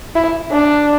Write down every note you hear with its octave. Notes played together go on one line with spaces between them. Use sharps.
E4
D4